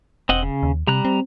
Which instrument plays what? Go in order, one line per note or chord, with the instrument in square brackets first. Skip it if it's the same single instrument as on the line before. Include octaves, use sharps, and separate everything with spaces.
[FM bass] E1 [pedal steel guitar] C4 D#5 F#5
[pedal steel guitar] C#3
[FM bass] D#2
[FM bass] C3 [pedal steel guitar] G3 A#5 F#6
[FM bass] C4